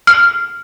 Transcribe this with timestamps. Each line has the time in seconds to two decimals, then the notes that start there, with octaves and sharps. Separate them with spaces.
0.07 F6